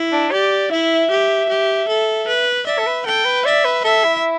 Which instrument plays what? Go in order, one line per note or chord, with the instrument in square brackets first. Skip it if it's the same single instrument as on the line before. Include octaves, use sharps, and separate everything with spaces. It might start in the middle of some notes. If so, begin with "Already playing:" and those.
Already playing: [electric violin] E4
[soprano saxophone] D4
[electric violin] G4 [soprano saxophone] D5
[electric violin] E4 [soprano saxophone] E5
[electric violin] G4
G4
A4
B4
[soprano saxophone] D5 [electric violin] E5
[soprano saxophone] A4
B4
[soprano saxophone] A4 [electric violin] G5
[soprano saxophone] B4
[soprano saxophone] D5 [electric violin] E5
[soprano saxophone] B4
[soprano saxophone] A4 [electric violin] E5
[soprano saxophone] E4